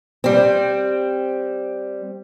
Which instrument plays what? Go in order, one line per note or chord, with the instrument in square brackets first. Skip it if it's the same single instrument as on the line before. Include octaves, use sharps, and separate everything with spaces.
[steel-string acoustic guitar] G3 C4